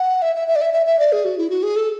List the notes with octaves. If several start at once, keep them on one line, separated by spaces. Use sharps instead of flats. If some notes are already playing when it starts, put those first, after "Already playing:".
Already playing: F#5
E5
E5
E5
D5
E5
E5
E5
D5
G#4
F#4
E4
F#4
G#4
A4